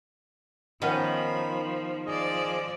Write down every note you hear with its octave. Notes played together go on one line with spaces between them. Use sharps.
D#3 F3 B3 C#4 B5
F3 G#4 D5 D#5